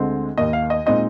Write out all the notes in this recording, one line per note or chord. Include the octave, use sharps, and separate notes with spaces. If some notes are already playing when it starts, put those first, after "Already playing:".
Already playing: D2 D3 G#3 C4
D#2 D#3 A#3 D#5
F5
D#5
A#2 G#3 C4 D#4 D#5